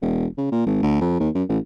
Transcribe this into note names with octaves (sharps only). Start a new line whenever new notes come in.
E1
C#3
A#2
G#1
D2
F2
D#2
F#2
A1